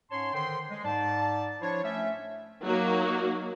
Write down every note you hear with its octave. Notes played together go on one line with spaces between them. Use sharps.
G#2 C#4 C#5 A5 C6
D3 D#3 C5 G5 C6
G#3
G#2 D5 A5
F3 D4 E4 C5 C#5
A3 C#4 E5
F#3 A#3 D#4 F#4